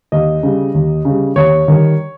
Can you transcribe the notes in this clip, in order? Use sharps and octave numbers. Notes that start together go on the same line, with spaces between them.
D#2 D#5
C#3 G3
D#2
C#3 G3
D#2 C#5
D#3 G3